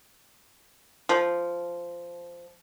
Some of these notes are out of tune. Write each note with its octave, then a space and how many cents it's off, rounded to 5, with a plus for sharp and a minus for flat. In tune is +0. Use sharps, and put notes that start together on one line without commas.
F3 -10